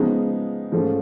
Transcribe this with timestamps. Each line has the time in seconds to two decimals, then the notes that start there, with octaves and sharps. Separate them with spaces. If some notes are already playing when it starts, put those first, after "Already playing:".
Already playing: C#3 F3 G#3 B3 D#4
0.72 G#2 F3 A3 C#4 F4